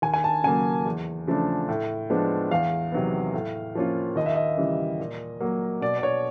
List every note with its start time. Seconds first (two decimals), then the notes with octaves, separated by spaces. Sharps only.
0.02 D#2 G#5
0.14 G#5
0.24 A5
0.44 C#3 F#3 A#3 G#5
0.86 E2
1.27 C#3 F3 A3 D4
1.69 A2
2.10 F3 G#3 B3 D4
2.51 E2 F5
2.92 C3 D#3 F#3 B3
3.33 A2
3.75 F3 A#3 C#4 F4
4.16 D#2 D#5
4.26 E5
4.35 D#5
4.57 C#3 E3 G3
5.00 A#2
5.40 F#3 A#3
5.81 B2 D5
5.99 D5
6.03 C#5